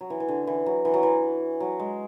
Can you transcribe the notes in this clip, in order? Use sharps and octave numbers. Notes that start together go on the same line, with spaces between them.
F#3
E3
E3
D3
E3
F#3
E3
F#3
E3
F#3
G#3